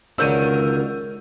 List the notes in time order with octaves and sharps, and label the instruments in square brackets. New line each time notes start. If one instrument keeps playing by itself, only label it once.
[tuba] C#2 [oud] D3 D#3 F#3 [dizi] A#4 [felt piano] E6 G6 D#7